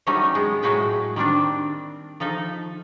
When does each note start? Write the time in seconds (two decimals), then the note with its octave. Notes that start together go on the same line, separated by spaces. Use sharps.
0.07 F#3 G3 A3 C#4 D#4
0.35 G#3 B3
0.63 A2 F#3 G#3 F#4 B4 G5
1.16 D#3 G3 C4 D4
2.20 F3 D#4 A4 E5